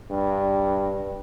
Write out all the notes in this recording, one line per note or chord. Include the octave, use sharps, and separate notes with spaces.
G2